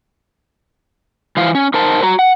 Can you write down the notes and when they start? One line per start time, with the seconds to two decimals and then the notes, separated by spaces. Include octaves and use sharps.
1.37 E3 F3 F5
1.55 C#4
1.74 D#4 A#4 C5 A5
2.03 F#4 A#5
2.19 F#5